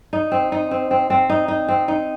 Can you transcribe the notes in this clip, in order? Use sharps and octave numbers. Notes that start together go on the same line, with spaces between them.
D#4
C4
D#4
C4
C4
C4
D#4
D#4
C4
D#4